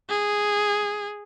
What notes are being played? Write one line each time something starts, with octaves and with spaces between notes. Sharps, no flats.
G#4